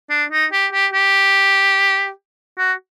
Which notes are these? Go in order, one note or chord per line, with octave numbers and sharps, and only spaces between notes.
D4
D#4
G4
G4
G4
F#4